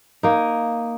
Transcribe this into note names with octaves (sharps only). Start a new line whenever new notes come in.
A#3 D#4